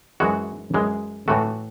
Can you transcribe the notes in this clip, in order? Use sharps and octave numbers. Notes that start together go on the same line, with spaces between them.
F#2 E3 G#3 F#4
F#2 E3 G#3
A2 E3 A3 F#4